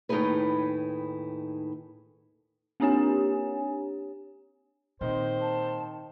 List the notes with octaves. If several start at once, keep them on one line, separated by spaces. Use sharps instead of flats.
D#2 A2 D#4 E4 G#4 B4
A#3 C4 D4 G4 C#5 G#5
A#2 D#3 C4 D#4 C5
A5